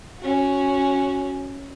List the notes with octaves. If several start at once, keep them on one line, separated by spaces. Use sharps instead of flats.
C#4 F#4